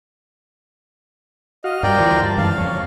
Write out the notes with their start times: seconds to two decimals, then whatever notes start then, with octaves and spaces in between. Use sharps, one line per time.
1.64 F#4 D#5 F5
1.83 G2 G3 A#4 D5 G5
1.98 D2 E3 F4 C5
2.22 G2 A5
2.38 F#2 E3 G#3 F5
2.58 F2 F3 C#5